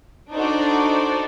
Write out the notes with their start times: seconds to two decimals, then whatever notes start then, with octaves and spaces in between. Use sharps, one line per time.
0.33 D4 D#4 F#4 A4 C5 D5